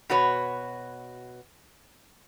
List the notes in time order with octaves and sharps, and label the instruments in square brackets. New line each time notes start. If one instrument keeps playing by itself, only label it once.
[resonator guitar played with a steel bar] B2 F#4 B4 C#5